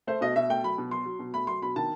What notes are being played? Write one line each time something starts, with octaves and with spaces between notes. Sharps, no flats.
A3 C5
B2 D#5
B2 E5
A3 G5
F#3 B5
B2
F#3 C6
F#3
B2
A3 B5
F#3 C6
B2 B5
D#3 A5